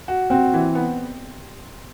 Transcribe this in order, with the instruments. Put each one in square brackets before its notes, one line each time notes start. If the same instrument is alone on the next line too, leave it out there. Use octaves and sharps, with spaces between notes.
[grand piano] F#4
[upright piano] C4 [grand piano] F#4
[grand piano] E3
B3